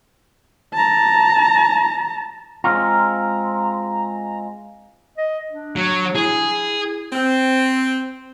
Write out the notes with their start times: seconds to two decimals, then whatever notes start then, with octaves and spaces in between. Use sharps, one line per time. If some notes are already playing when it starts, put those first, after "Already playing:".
0.74 A5 A#5
2.64 G#3 C4 F4 A#5
5.18 D#5
5.51 D4
5.76 F#3
6.15 E4 G#4
7.13 C4